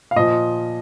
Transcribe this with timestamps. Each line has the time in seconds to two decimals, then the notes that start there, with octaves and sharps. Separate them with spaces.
0.11 F5
0.16 A#2 F3 D#5